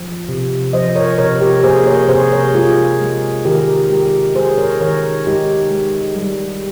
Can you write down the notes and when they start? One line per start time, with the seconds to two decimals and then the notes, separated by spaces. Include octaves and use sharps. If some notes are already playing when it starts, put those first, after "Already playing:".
Already playing: F3
0.29 C3
0.73 F3 C5 D#5
0.95 A#4 C#5
1.18 C3 A#4 C#5
1.41 G4 A#4
1.63 A#3 G#4 C5
1.86 A#4 C#5
2.09 C3 G#4 C5
2.32 A#4 C#5
2.54 G#3 F4 G#4
3.00 G#3
3.45 D#3 G4 A#4
3.90 G#3 G4 A#4
4.35 G#3 G#4 C5
4.58 A#4 C#5
4.81 D#3 A#4 C#5
5.27 G#3 D#4 G4
5.71 G#3
6.16 G3